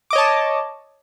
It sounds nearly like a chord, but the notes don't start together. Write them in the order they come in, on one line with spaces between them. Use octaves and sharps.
D6 D#5 C#5 A5